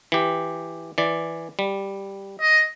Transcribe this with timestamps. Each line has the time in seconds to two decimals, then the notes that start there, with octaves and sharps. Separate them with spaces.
0.12 E3 G4
0.98 E3 D5
1.59 G3
2.41 D#5